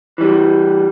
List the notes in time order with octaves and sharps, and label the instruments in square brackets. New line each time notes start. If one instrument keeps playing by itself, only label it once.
[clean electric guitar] E3 G3